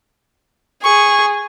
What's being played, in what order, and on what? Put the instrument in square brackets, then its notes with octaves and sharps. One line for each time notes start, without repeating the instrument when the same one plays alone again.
[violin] G#4 [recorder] C#6